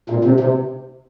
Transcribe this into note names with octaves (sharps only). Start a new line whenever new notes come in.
A#2
C3
C3